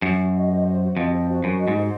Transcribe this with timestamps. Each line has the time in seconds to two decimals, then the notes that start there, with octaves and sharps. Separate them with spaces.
0.02 F#2 F#4
0.18 F#4
0.34 D#5
0.50 C5
0.66 F#4
0.81 F#4
0.97 F2 D#5
1.12 C5
1.29 F#4
1.44 F#2 F#4
1.60 D#5
1.68 G#2
1.75 C5